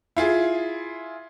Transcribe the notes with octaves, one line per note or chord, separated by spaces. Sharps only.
E4 F4 G#4